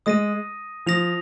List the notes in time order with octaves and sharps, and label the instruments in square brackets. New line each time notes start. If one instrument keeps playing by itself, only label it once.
[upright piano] G#3 [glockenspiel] D#6 A#6 D#7
[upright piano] F3 [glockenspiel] D#6 A#6 F7